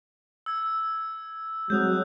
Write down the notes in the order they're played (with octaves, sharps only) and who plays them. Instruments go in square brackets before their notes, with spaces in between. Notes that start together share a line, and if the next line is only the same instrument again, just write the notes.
[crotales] E6 G#6
[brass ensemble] F#3 [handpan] G#3 C4 [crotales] D#6 F#6 G6